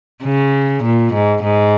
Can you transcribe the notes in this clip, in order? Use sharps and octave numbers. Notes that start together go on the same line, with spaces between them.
C#3
A#2
G#2
G#2